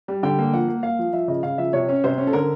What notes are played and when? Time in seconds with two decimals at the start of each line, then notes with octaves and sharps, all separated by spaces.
0.08 G3
0.23 D3 G5
0.39 A#3
0.53 F3 F#5
0.68 A#3
0.83 A#3 F5
0.99 F3
1.13 F3 E5
1.28 C#3 D#5
1.43 C#3 F5
1.58 F3 E5
1.73 C3 C#5
1.89 C#4
2.04 C3 C5
2.18 C#4
2.27 A4
2.33 D3 A#4